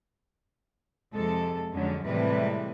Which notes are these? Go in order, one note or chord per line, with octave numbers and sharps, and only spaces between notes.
F2 C3 G#3 A4
F2 D3 F#3 G#3 C#4
A2 C3 E3 G3 G#3 B4